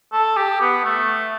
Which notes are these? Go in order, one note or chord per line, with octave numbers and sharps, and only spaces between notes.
A4
G4
B3
A3